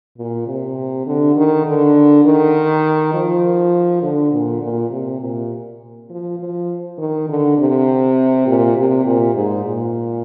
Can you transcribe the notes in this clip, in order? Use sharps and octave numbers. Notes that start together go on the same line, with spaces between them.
A#2
C3
D3
D#3
D3
D#3
F3
D3
A#2
A#2
C3
A#2
F3
F3
D#3
D3
C3
A#2
C3
A#2
G#2
A#2